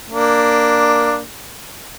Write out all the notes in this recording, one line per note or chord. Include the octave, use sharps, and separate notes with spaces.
A#3 D4